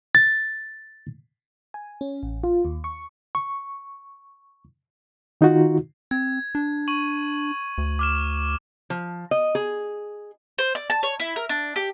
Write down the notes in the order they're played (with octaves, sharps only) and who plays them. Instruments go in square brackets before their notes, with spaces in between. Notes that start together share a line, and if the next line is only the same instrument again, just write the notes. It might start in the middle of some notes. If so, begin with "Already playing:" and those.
[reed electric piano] A6
[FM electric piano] G#5
C#4
A1
F4
D#2
C#6
[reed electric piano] C#6
D#3 D#4 F4 F#4
[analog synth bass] C4 [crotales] G#6
[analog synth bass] D4
[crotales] C#6 D#7 F#7
[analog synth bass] D2
[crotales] D6 F6 E7
[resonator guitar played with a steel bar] F3
D#5
G#4
[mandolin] C5
D5
A5
C#5
E4
A#4
D4
G4